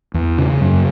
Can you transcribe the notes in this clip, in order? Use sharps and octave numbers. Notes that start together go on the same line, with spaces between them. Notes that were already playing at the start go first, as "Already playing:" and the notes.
E2
C#3
F#2